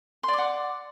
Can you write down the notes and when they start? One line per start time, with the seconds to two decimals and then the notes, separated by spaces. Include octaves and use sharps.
0.23 C6
0.28 D5
0.33 D6
0.38 F#5